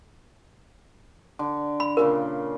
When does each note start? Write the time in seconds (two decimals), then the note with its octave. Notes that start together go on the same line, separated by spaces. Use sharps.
1.39 D3
1.80 B5
1.97 A#2 C#3 F4 A#4